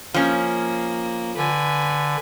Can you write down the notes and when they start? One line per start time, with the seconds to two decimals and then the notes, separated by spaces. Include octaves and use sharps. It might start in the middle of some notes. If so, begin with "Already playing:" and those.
0.14 F3 A#3 C#4
1.37 D3 B4 G#5